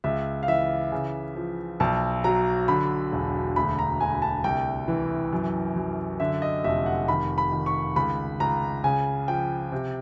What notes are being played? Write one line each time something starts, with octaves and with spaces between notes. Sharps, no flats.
C#2 E5
F5
E3 E5
C#3
F3
B1 A5
F#3 A#5
D3 B5
E1
D2 B5
A#5
D2 G#5
A5
C2 G5
E3
F#2
F#2
D3 E5
D#5
F1 E5
F#5
D#3 B5
B5
D#3
C#6
C#2 B5
C#2 A#5
C#3 G#5
F3 G5
C3